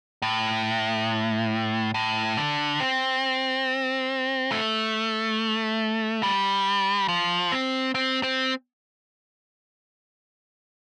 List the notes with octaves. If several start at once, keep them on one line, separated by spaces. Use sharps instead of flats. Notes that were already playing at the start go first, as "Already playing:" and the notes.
A2
A2
D3
C4
A3
G3
F3
C4
C4
C4